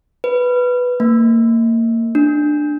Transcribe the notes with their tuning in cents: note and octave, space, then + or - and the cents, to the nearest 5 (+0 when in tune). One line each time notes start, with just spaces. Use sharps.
B4 +0
A#3 -30
D4 +15